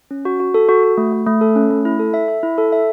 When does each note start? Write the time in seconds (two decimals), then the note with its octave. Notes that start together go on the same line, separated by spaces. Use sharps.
0.11 C#4
0.25 F#4
0.40 F#4
0.54 A4
0.69 F#4
0.83 F#4
0.97 A3
1.13 A3
1.27 A3
1.41 A4
1.56 C#4
1.71 A3
1.85 E4
1.99 A4
2.14 E5
2.28 E5
2.43 E4
2.58 A4
2.72 E5